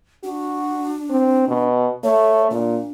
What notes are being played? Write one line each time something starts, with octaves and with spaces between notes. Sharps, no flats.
D4 F#4
C4
B2
A3 C#5
A#2 D4